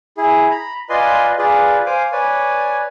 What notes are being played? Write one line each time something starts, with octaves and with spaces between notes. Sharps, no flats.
E4 G#4
A#5 B5
F4 B4 D5 D#5 G#5 C6
F4 G#4 B4 D5
C5 F5 G#5 D6
B4 C#5 D5 G#5